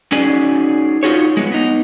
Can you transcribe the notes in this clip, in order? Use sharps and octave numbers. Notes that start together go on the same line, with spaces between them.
C#4 D#4 F#4 G#4 D5 G#5
D#4 F4 F#4 G#4 C#5
G#3 B3
B3 D#4